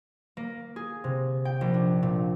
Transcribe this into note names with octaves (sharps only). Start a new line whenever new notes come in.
A#3
G#4
C3
G5
A#1
D4
A#2